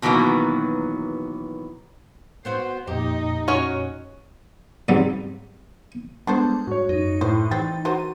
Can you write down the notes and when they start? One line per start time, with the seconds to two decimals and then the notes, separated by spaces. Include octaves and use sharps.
0.02 B2 D#3 E3 F#3 A#3 B3
2.45 B3 C4 F#4 C5
2.87 F2 A#2 D#4 G4
3.48 C#4 F#4 C#5
4.89 G#2 C#3 F#3 G3 C4
6.27 G3 G#3 B3 D4 A4 C5
6.67 G#2 F#4 C#5
6.89 F#2 D#4
7.21 A2 C5
7.51 E3 G3 C4 G4 A6
7.85 F#4 A#4 C5 D#7